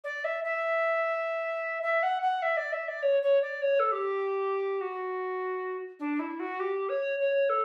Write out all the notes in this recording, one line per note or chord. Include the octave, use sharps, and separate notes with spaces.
D5
E5
E5
E5
F#5
F#5
E5
D5
E5
D5
C#5
C#5
D5
C#5
A4
G4
F#4
D4
E4
F#4
G4
C#5
C#5
A4